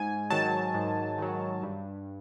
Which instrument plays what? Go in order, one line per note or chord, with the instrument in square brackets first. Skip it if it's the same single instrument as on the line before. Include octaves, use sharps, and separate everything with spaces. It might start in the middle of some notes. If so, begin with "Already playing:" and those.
Already playing: [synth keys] G#2 G#5
D#3 F#3 A5
G#2
D#3 F#3
G2